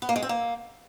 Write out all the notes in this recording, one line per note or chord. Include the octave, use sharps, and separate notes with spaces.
B3
A#3
G#3
C4
A#3